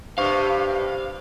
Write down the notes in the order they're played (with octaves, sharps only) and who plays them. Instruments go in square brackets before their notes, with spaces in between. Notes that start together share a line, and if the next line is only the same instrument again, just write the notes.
[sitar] G2 C3 [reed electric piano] C5 C#6 [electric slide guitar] F5